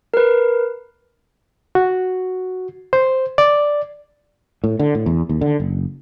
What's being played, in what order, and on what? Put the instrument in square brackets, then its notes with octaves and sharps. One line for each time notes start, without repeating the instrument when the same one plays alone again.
[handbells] A#4 B4
[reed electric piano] F#4
C5
D5
[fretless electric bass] A2
D3
A2
E2
D#2
D3
F#1